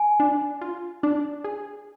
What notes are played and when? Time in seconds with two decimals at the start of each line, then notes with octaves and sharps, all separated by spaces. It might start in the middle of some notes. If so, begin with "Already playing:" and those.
Already playing: G#5
0.20 D4
0.61 F4
1.03 D4
1.44 G#4